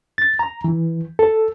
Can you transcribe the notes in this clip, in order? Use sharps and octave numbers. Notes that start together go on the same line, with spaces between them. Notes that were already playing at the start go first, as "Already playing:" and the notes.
A6
A#5
E3
A4